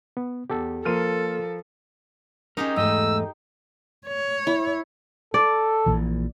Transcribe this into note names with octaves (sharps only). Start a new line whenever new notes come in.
B3
E2 G4 A4
F3 A#3 A4 A#4 C6 F6 D#7
C#4 D#4 G4 G#4 A#4
E2 G#2 A3 D#5 E6
C#5
E4
A4 D5
A#1 A#2 E3